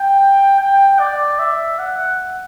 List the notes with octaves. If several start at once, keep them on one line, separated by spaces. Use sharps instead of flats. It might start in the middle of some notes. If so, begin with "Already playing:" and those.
Already playing: G5
G5
D5
E5
F#5